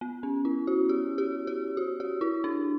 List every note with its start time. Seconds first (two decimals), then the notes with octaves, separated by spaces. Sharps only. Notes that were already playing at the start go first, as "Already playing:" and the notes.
0.01 B3
0.23 C#4
0.45 E4
0.67 F#4
0.89 G4
1.18 G4
1.47 G4
1.77 F#4
2.00 G4
2.21 E4
2.44 D4